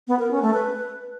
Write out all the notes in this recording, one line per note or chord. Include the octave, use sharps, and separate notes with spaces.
B3
A#4
C#4
A3
B4